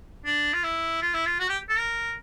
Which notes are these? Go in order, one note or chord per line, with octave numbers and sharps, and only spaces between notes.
D4
F4
E4
F4
E4
F4
F#4
G4
A4
A#4